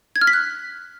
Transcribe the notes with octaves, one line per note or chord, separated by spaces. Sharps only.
G#6
F6
B6
F#6